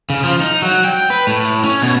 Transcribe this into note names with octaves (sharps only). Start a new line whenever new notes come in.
C#3
F3
D#4
F#3
G5
B4
A2
C#4
B2